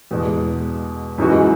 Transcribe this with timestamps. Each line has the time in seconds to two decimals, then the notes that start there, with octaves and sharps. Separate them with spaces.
0.11 E2 B2 G#3
1.18 F#2 E3 G#3 D#4 F#4